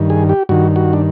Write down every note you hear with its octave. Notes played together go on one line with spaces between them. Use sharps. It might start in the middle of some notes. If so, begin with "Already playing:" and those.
Already playing: G2 D#3
G#4
G4
G2 D#3 F#4
F#4
D4